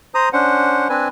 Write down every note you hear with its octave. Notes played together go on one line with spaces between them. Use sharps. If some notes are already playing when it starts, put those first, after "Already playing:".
C5 A#5 D#6
C#4 D4 C5 F#5
C4 D4 B4 G#5